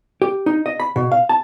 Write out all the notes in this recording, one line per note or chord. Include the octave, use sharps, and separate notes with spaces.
G4
D#4
D#5
B5
B2
F5
A5